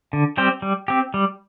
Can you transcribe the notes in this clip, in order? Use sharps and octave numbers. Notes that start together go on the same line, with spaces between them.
D3
G3 C4 G4 C5
G3
C4 G4
G3